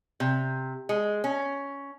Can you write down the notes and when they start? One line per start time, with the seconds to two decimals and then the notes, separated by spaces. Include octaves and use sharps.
0.20 C3
0.89 G#3
1.24 C#4